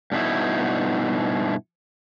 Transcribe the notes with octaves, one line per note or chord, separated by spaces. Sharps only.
G2 B2 D#4 E4